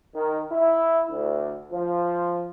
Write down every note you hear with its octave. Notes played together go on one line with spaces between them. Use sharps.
D#3
E4
D2
F3